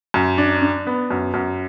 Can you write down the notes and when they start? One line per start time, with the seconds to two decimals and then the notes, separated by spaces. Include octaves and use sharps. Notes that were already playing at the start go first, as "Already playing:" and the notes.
0.14 F#2
0.38 D4
0.62 D4
0.87 B3
1.11 F#2
1.34 F#2